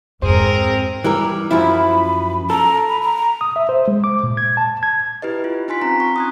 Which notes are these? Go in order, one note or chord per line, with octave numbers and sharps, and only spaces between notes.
F2 G#2 C4 G#4 A#4
E3 G3 A#4
F#2 F3 E4 B5
A4 A#5
B5
A#5
D#6
E5
C5
G#3
D6
A#2
G#6
A5
G#6
E4 G4 B4 D#5
F4
D#4 F4 G#5 C6 B6
C4 C#4 A#5
C#6
D#6 F#6 G#6